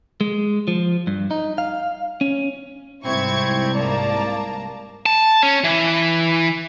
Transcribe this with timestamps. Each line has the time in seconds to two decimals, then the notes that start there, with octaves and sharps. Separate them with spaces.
0.21 G#3
0.68 F3
1.07 G2
1.31 D#4
1.58 F5
2.21 C#4
3.05 C2 G#2 C4 E4 C#6 G#6
3.74 A#3 D5 A5 A#5
5.06 A5
5.43 C#4
5.64 E3